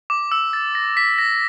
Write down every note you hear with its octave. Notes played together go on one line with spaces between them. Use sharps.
D6
E6
A6
A#6
B6
A#6